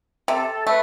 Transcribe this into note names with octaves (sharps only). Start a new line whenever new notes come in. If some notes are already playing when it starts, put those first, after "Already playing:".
C3 A4
A3 B4